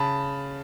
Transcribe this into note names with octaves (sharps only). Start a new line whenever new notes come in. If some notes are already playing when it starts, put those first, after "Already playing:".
Already playing: C#3 A5 B5